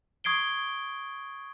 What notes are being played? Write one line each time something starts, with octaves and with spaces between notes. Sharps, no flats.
C#6 D#6 G#6 C7 D7 G7